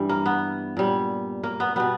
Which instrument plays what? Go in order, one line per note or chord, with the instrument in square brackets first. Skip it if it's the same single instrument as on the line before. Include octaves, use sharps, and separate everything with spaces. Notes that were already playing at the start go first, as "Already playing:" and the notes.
Already playing: [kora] G2 E3 G3
A#3
B3
A#2 G3
A#3
B3
B2 G3 B3